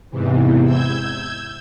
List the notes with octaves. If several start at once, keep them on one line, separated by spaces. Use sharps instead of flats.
E2 G#2 C3 E3
E6 G6 G#6